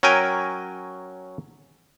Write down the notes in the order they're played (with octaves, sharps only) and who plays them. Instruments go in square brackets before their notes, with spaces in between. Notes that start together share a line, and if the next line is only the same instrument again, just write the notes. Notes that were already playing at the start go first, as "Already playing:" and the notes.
[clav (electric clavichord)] F#3 C#4 A#4 G5 G#5